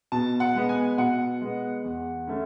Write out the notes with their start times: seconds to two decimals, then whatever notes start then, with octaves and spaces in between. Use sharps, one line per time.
0.12 B2 A5
0.40 F#5
0.55 G#3 B3
0.69 G#5
0.98 B2 F#5
1.41 G#3 B3
1.84 E2
2.27 D3 A3 C#4